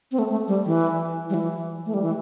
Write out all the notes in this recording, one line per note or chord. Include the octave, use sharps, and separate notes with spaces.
C4
A3
A3
G3
E3
G3
E3
A3
G3
E3